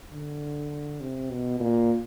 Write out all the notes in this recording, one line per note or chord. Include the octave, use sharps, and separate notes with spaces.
D3
C3
B2
A#2